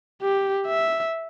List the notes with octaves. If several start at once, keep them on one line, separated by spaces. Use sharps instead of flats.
G4
E5